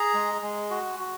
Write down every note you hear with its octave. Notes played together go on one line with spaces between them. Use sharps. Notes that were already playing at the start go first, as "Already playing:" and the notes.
Already playing: G#4 A#5
G#3
G#3
F#4
F#4